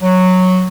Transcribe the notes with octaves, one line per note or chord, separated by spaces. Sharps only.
F#3